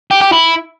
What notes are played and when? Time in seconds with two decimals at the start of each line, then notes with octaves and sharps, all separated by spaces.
0.11 G4
0.21 G4
0.32 E4